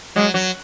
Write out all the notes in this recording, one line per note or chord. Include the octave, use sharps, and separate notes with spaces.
F#3 G#3
F#3